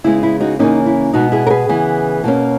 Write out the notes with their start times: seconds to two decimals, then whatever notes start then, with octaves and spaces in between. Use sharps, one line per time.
0.04 C#3 G#3 B3 E4
0.23 E4
0.40 D#4 F#4
0.59 C#3 E3 A#3 C#4 D#4
0.86 E4
1.13 B2 G#3 B3 D#4 F#4
1.32 E4 G#4
1.47 A#4
1.50 G#4 B4
1.69 C#3 E3 B3
2.24 B2 A#3 C#4